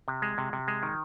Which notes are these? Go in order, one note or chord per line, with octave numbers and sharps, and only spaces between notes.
C3
G#3
C3
C3
G#3
D#3